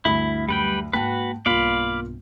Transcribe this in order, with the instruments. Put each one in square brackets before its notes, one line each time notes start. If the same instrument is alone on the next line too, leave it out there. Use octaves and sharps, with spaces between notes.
[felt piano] D2 B5 [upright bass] G2 [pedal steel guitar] E4
[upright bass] F#2 [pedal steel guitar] G3 B4 G5
[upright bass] G#2 A#3 [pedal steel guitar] F#4 B4 [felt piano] G5 A5
[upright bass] B1 G2 [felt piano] A#3 F4 [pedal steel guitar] D5 F5 B5